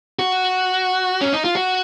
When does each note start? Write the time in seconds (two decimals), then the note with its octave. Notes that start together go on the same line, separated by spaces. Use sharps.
0.19 F#4
1.21 C#4
1.33 D#4
1.44 F4
1.56 F#4